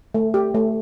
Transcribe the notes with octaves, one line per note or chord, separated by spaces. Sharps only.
A3
G4
A3